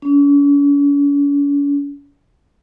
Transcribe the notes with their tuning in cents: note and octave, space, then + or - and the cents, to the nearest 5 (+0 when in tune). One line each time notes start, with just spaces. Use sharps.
C#4 +45